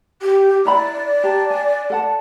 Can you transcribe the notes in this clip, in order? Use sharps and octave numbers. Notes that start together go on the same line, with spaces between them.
G4
E4 D5 A#5 B5
G4 A5 A#5
G#5
A4 F#5 A5